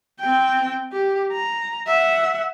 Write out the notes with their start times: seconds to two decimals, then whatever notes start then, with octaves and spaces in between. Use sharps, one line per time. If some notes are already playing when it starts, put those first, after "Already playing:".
0.20 C4 G5
0.93 G4
1.32 A#5
1.87 E5 F#5